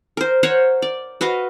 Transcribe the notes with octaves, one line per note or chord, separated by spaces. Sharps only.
A#4 C5
A#4 C5 C#5 F#5
D5
F#4 B4 D#5 F5